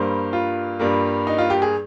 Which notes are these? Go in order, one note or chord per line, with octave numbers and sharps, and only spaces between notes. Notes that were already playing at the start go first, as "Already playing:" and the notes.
Already playing: G2 G3 A#3 C5
F4
G2 G3 A#3
D#4
F4
G4
G#4